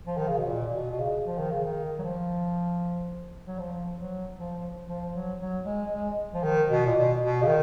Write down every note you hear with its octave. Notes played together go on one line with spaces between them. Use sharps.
F3
D#3
C#3
B2
A#2
B2
B2
C#3
F3
D#3
C#3
D#3
F#3
F3
F#3
F3
F#3
F3
F3
F#3
F#3
G#3
G#3
F3
D#3
B2
A#2
B2
B2
C#3
D#3